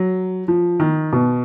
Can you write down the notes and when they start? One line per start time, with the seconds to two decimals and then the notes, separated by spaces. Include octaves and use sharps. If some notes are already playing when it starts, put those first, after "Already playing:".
Already playing: F#3
0.48 F3
0.80 D#3
1.13 B2